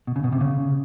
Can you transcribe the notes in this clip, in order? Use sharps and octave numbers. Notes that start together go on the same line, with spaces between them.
B2
C#3
B2
C3
C#3